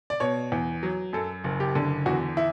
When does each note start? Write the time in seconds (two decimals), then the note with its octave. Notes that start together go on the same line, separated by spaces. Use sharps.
0.10 D5
0.20 B2 C#5
0.52 E2
0.83 F#3
1.13 F#2 A4
1.44 F#1
1.60 G4
1.75 D3
2.06 E2 F#4
2.37 E4